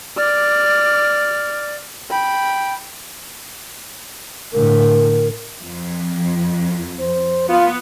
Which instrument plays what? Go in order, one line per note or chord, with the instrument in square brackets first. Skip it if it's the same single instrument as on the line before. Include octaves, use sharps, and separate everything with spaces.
[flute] D5 [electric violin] D6 F6
[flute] G5 [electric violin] B5
[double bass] A2 D3 [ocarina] A#4
[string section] F2
[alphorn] C5
[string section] B3 [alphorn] F4